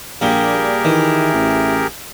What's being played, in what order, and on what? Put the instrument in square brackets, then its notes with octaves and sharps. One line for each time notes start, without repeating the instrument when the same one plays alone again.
[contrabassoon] A#1 [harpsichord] A#2 G3 [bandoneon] G4 G#4 A#4
[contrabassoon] D#3 [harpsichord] E3
[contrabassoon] A1